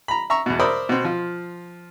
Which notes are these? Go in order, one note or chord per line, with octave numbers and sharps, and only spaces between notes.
A#5 B5
E5 A#5 C#6 E6
E2 B2
A#4 C5 D5 E5 B5 D#6
B2 C4
F3 F4